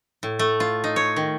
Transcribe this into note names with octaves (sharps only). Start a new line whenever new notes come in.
A2
A3
F4
D#4
C#5
D#3